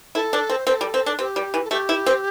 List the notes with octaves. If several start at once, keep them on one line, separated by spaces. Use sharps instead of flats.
E4 A4
D4
C4
C5
C4 A4
G3
C4
D4
C4 G4
G3
E3
A4
A3 G4
E4
C4